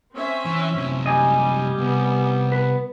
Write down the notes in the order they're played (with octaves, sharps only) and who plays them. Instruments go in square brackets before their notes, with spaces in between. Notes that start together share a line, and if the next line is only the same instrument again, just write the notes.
[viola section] C4 C#4 E5
[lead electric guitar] E3
F#2 C3
[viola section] G3 [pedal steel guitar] D#5 G#5
[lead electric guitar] C2 [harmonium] B3
[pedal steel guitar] B4